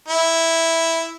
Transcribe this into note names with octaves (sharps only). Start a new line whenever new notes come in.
E4